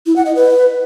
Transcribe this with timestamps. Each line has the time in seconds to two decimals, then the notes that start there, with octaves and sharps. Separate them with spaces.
0.06 E4
0.16 F#5
0.26 D#5
0.35 B4